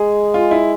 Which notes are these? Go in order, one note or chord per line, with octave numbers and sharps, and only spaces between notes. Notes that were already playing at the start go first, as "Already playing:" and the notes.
Already playing: G#3 G#4
F4
E4